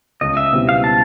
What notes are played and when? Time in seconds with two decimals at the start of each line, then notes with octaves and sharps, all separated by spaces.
0.21 C#2 D#5
0.37 E5
0.53 B2 G3 C4 E4
0.69 F5
0.84 A5